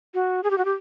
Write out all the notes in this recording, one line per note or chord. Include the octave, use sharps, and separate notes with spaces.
F#4
G#4
G4
F#4
G4